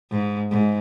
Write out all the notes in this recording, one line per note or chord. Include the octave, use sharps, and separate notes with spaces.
G#2
G#2